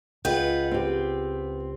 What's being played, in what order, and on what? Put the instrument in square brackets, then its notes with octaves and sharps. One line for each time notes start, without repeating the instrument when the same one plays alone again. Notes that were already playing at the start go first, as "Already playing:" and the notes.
[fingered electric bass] C#2 [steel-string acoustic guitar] F4 B4 F#5 [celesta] G#4 G5 G6 [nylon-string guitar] D#5
[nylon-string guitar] C4 G4